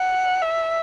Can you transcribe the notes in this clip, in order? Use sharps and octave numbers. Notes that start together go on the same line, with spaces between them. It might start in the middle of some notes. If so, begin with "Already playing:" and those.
Already playing: F#5
E5